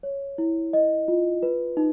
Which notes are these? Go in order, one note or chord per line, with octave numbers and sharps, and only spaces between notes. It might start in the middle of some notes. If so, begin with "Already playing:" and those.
C#5
E4
D#5
F4
B4
D#4